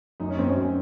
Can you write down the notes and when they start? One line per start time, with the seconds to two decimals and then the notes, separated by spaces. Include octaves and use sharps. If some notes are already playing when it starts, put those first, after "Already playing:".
0.20 F#2 D#4
0.30 C#4
0.38 F#2 C4
0.49 C#4
0.56 F#2